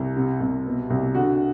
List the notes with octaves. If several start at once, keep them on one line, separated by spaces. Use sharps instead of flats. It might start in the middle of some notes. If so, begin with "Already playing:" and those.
Already playing: C2
C3
C2
B2
C2
D3 F#4